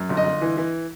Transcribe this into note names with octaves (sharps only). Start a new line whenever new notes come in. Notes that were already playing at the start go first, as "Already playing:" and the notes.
Already playing: F#2
G1
D#5
G1
E3
E3